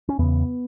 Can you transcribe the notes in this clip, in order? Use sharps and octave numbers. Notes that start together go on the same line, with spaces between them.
C#4
E2 C#3 B3